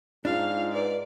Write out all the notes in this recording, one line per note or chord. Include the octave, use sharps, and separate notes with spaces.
G#2 D4 F4 F5
B4 D5